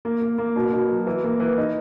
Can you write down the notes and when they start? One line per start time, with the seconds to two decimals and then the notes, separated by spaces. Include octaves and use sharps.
0.05 A#3
0.22 A#3
0.38 A#3
0.56 B2
0.73 B2
0.89 F#3
1.07 E3
1.24 A#3
1.40 E3
1.58 D#4